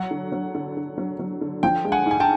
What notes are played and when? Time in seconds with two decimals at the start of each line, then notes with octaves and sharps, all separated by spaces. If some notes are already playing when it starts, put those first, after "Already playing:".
Already playing: F#3 F#5
0.11 D3
0.32 F#3
0.55 D3
0.77 D3
0.98 F#3
1.19 F#3
1.41 D3
1.63 F3 G5
1.84 G#3
1.92 F#5 G#5
2.06 G#2
2.11 G#5
2.20 G5 A5